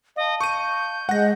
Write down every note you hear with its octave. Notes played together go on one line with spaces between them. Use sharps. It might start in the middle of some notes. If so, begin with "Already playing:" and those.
D#5 F5 A5
C#6 G6 D#7
G#3 F#5 A#6